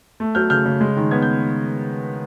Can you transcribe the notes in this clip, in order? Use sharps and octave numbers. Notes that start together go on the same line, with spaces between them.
A3
F#3 F6 G6
C#3 F6 G6
C#3
G#3
D#3
B3 G#6
G6